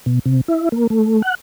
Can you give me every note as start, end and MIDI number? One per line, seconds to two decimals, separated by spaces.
0.06 0.19 47
0.26 0.41 48
0.48 0.69 64
0.72 0.87 58
0.90 1.22 57
1.22 1.35 78